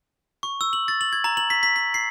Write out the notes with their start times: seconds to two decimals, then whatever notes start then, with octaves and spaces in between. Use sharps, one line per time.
0.43 C#6
0.61 E6
0.73 F#7
0.88 A6
1.01 F#7
1.13 G#6
1.24 A#5
1.37 F#7
1.50 B6
1.63 B6
1.76 B6
1.94 C7